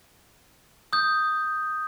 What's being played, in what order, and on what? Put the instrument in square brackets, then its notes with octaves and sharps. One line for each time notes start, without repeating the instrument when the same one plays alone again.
[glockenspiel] D#6 G6